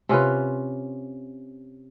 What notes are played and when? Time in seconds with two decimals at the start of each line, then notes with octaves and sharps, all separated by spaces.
0.09 C3 C#4 F4 B4